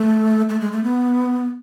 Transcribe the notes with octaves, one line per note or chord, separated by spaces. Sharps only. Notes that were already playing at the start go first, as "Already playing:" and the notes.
Already playing: A3
A3
G#3
A3
B3